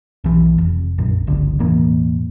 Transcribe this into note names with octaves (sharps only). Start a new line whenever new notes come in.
B1 E3
F1
A#1 F#2
G1 C#2 D3
E1 A2 E3 A#3